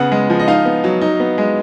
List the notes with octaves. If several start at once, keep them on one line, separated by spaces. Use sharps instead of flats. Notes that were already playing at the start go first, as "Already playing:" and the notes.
Already playing: C#3 B3 F#5
G#3
F3
D#5
D#4 F5
B3
F#3
D#4
B3
G#3